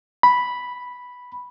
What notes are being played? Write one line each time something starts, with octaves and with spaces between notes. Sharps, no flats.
B5